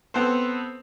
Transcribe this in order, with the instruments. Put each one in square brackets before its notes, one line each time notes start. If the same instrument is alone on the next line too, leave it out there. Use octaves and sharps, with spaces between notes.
[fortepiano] B3 C4 A4 B4 C5